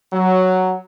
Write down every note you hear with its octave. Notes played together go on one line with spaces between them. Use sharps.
F#3